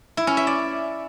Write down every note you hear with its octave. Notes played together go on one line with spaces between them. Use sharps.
E4
C#4
E5
D5